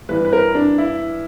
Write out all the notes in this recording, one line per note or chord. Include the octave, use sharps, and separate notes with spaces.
G2 E3 B4
B4
A#4
D4
E4